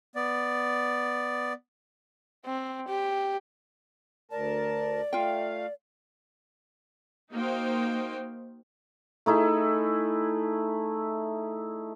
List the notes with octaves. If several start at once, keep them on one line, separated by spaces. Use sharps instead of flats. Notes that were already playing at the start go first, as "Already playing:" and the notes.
B3 D5
C4
G4
D2 A#4 D5 A5
A3 F4 F5 G5
A#3 D#4 F#4 C5 F5 G5
A3 D#4 E4 G#4